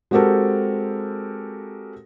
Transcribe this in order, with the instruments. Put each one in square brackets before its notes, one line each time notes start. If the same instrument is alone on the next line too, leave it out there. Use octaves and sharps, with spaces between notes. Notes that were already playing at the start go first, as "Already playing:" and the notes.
[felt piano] G#3 C4 F#4 G4 A4 A#4